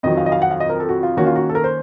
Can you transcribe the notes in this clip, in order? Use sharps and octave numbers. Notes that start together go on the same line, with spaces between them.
F2 D#3 F#3 D#5
F5
D#5
F5
F#5
F5
D#5
A#4
A4
F#4
F4
D#3 A#3 C#4 F#4
F4
F#4
A4
A#4
C5